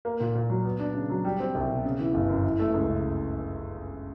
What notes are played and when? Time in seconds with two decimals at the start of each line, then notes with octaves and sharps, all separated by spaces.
0.05 A#3
0.20 A#2
0.35 A#2
0.50 F#3
0.65 B3
0.79 D4
0.94 C#3
1.10 F#3
1.25 G3
1.40 C4
1.55 C2
1.69 B2
1.85 C#3
1.99 E3
2.14 G1
2.29 F#2
2.44 E3
2.59 A3
2.74 C#2
2.88 C#3